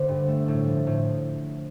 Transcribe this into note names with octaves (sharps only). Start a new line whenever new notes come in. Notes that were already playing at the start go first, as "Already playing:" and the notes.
Already playing: D3 A3 C5
G2
A3
A2
F3
A2